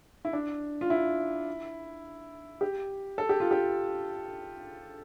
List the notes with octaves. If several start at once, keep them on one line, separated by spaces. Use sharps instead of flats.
E4
D4
F4
E4
G4
A4
G4
F4
G4